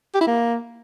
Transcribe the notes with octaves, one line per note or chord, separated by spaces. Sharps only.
G4
E4
A#3